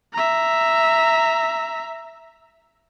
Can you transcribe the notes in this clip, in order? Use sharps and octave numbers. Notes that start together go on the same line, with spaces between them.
E5 A#5